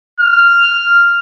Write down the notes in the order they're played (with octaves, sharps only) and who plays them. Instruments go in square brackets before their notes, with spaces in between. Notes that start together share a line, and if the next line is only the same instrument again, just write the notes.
[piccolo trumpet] F6